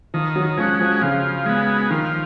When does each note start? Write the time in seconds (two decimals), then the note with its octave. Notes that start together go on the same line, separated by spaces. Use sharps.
0.14 D#3 F3
0.36 F#3
0.57 F3 G#3 C#4 F#4
0.81 F3
1.02 C#3 F3
1.46 G#3 B3
1.90 D#3 F3